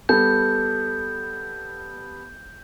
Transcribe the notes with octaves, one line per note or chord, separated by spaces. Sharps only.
G3 B3 A4 G6